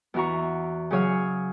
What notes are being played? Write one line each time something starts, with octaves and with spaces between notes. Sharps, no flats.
E2 E3 F#4 A#5 C#6
C#3 F#3 G#4 C#5 F5